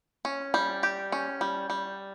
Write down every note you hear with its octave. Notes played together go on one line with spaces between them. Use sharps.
C#4
G3
G4
C#4
G3
G3